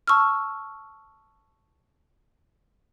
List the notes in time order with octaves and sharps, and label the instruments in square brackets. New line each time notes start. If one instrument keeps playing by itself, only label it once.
[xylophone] A5 C#6 E6 F6